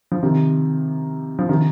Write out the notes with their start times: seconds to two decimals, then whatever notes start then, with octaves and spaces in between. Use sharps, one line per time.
0.12 F3
0.23 C3 D#3
1.39 F3
1.49 C3 D#3